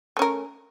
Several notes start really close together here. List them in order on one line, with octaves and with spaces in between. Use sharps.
A3 C#4 A#4